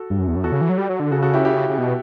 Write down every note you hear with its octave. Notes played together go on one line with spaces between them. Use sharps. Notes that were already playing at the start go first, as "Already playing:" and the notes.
Already playing: F#4 A4
G2
F#2
E2
F#2
E2 F#4 A4
C#3
E3
F#3
G3
F#3
D3
C#3 F#4 A4
F#4 A4
E4 G4
E4 G4
C#3
B2